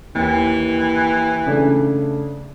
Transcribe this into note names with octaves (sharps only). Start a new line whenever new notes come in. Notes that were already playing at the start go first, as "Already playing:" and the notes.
D#2 E3
C#3 A3 D4